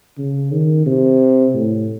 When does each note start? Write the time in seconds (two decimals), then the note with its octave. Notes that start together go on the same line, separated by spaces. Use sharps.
0.18 C#3
0.52 D#3
0.86 C3
1.54 A2